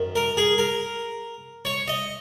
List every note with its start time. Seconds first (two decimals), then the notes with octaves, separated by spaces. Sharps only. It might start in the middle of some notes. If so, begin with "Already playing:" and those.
Already playing: F#2 D#3
0.16 A#4
0.37 G#4
0.58 A#4
1.65 C#5
1.88 D#5